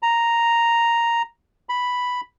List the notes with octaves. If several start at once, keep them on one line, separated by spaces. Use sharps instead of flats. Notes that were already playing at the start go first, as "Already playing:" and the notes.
A#5
B5